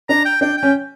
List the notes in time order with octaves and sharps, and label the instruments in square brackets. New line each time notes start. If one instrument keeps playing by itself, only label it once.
[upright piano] D4 [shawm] A#5
[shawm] G5
[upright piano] D4 [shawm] G5
[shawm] G5
[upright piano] C#4